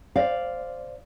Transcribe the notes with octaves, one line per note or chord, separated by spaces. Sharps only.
C5 D5 F5